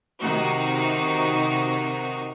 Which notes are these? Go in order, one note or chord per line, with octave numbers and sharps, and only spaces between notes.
C3 D#3 D#4 F#4